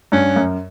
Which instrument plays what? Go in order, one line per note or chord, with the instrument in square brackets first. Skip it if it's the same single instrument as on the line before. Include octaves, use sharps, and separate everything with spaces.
[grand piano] G2 [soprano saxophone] C#4
[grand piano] F#2